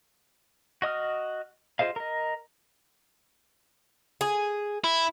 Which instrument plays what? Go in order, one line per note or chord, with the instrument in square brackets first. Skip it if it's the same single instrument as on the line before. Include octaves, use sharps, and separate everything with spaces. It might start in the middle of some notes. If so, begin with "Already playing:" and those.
[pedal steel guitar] F#4 D#5 D#6 F6
F4 G#4 C5 D#5 F5
A#4 D#5
[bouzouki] G#4
[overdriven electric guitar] E4